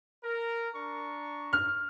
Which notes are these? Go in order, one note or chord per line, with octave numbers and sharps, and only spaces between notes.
A#4
D4 A#5 C#6
F6